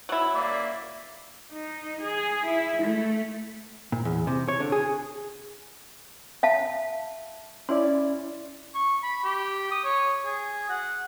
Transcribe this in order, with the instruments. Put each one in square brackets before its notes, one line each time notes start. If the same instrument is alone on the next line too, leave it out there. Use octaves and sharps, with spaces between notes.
[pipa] F#3 E4
[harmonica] A#3 D5 E5
[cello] D#4
G#4
E4
A3
[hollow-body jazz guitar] A#2
E2
C3
C#5
D3
G#4
[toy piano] E5 F5 A5
[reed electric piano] C#4 E4 D5 [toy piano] C6
[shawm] C#6
B5
G4
D#6
C#5
G#4
F#5